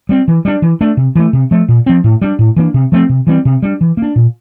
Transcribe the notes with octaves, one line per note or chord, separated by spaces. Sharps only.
G3 C4
E3
G3 D4
E3
A3 D4
C3
E3 A3
C3
F3 A3
A#2
F3 C4
A2
G3 D4
A2
E3 A#3 D4
C3
F3 A3 C4
C3
E3 G3 C4
C3
G3 D4
E3
A#3
D4
A#2